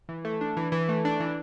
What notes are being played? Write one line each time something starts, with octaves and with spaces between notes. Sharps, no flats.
E3
A3
D4
E3
E3
A3
D4
E3